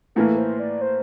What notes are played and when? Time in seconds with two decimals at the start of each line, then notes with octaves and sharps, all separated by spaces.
0.15 A2 E3 A#3 A4
0.38 C5
0.60 D5
0.81 C5